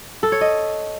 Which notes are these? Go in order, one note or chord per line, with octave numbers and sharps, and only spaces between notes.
A4
C#5
D#5